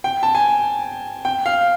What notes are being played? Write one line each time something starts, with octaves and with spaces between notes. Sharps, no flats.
G5
A5
G#5
G5
F5